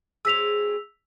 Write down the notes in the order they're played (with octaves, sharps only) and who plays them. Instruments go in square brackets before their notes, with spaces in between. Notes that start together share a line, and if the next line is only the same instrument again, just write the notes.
[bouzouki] F#3 C4 G#4 [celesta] E6 B6 F7